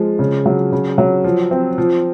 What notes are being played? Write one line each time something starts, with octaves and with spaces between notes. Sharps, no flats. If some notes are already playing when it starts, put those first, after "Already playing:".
Already playing: F3 G#3
C#3
F#3
C#3
F#3
F3
C4
F3